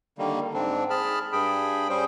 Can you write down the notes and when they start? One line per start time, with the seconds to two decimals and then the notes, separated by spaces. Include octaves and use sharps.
0.18 D3 D#3 G3 A#3
0.54 G#2 C4 D4
0.90 G#4 A5 B5 F6
1.33 G2 G#4 G5 B5
1.89 G3 C#4 G#4 C5 G5